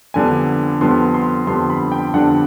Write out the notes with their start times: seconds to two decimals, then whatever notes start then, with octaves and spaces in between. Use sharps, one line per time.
0.14 F2 D3 G3 B3 D4 G#5
0.81 F2 D3 G3 B3 D4 C6
1.14 C6
1.47 F2 D3 G3 B3 D4 C6
1.70 B5
1.92 G5
2.13 F2 D3 G3 B3 D4 F#5